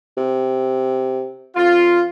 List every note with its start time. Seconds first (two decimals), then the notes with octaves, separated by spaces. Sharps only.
0.17 C3
1.56 F2 F4